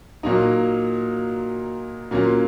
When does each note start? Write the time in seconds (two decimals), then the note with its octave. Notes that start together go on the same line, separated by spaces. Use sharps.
0.23 A#2 F#3 A#3 D#4
2.11 A#2 F#3 A#3 C#4 F4